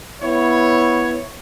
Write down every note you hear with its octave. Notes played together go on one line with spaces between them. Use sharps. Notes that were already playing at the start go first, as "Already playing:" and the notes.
B3 E4 C#5